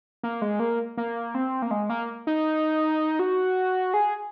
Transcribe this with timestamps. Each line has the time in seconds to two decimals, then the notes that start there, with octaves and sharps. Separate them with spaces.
0.23 A#3
0.42 G#3
0.60 A#3
0.97 A#3
1.35 C4
1.62 A#3
1.71 G#3
1.90 A#3
2.27 D#4
3.19 F#4
3.94 G#4